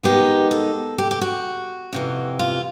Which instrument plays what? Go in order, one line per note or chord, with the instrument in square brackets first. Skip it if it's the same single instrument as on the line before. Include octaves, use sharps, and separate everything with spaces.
[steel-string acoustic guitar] D#3 G#3 B3 D#4 G4
A4
G4
G4
F#4
F2 C3 E3
F4